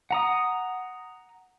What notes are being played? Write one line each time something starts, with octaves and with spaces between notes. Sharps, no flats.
F#5 A#5 D#6